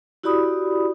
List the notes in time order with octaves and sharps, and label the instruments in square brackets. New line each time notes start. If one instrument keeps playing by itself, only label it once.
[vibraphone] E4 F#4 G4 D5 B5 D#6